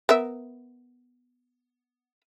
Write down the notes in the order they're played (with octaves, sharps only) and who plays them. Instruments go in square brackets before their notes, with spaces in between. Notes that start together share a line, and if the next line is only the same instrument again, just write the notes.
[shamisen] B3 A#4 E5